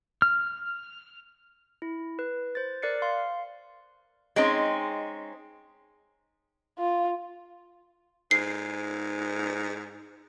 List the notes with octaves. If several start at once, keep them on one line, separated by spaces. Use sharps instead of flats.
F6
E4
B4
C5 A6
A#4 D5 F#6 A6 C7 C#7
F5 C6
G#3 C4 C#4 D#4
F4
G#2 C7